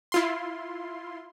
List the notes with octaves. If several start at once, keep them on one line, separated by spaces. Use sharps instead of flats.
E4 F4 C6